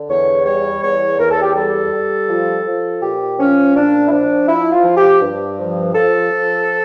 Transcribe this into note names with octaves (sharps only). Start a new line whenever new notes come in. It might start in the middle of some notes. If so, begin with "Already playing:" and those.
Already playing: D3
E2 C#5
G3 C#5
E2 C#5
E2 A#4
A4
G4
G3 A4
G3
F3
F3
A#2 G4
F3 C#4
A#2 D4
E4
F3 D4
F3 E4
F4
F3
G4
G2
F3
F3 A4
F3